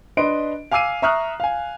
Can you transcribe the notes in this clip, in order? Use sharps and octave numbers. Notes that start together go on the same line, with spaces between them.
D4 B4 D#5 C6 D7
F5 G#5 D6 E6 C7 D#7
E5 A#5 C#6 D#6 F6 F#6
F5 G#5